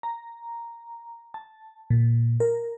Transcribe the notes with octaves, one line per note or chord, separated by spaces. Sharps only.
A#5
A5
A#2
A#4